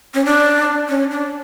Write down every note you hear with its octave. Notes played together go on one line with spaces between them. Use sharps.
C#4
D4
C#4
D4